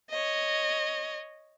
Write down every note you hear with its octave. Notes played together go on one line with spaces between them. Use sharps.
C#5 D#5